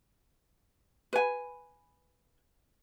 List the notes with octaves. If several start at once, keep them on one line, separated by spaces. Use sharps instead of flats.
B4 G#5